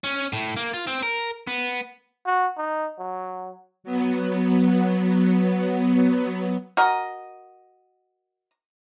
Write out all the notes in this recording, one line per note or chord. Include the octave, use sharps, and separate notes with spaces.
C#4
A2
A#3
F4
C4
A#4
B3
F#4
D#4
F#3
F#3 B3
F#4 A#4 D#5